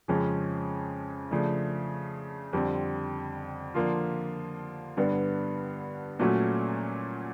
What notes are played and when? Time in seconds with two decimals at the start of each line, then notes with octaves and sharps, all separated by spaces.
0.08 F2 C#3 F3 G#3 C#4
1.31 C#3 F3 A3 D4
2.53 F2 D3 G3 C4
3.74 D3 F3 A#3 D4 F4
4.97 G2 D3 G3 B3
6.19 A#2 F#3 A3 C#4 F#4